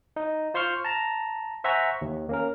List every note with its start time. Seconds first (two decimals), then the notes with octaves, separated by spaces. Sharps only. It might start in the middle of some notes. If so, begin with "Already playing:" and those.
0.16 D#4
0.54 F4 C5 C6 C#6 F6
0.85 A5 A#5
1.64 C5 E5 F#5 G#5 A#5 C#6
2.02 D#2
2.29 A#3 C#4 A#4